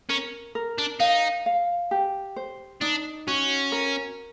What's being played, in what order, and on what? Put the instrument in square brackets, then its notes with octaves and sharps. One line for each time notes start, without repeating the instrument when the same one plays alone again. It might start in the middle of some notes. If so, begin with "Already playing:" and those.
[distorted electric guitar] C#4 [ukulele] A#4
[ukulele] A#4
[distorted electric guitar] D4
[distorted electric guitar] D#4 [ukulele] F5
[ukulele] F5
G4
C5
[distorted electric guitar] D4 [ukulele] D#4
[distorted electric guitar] C#4 [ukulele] F#4
[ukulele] A#4